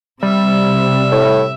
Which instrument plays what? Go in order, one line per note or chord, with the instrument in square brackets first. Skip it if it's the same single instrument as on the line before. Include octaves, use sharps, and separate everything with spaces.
[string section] C3 [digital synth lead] G3 [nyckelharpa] E5
[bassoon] A2